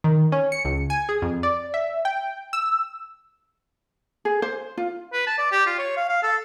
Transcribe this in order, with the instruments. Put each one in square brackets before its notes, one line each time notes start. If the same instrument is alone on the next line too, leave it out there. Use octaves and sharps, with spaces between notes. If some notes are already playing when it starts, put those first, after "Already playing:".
[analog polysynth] D#3
C#4
C#7
C#2
G#5
G#4
F2
D5
E5
G5
E6
[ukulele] G#4
C5
F4
[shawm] B4
A5
D5
G4
F4
C#5
F5
F5
A4